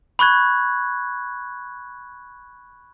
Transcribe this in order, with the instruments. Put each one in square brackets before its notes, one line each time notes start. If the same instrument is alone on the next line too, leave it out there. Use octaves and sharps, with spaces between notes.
[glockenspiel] B5 C#6 F#6 G#6